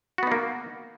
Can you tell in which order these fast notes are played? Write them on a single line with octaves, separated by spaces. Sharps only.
F#4 B3 D#4 A#3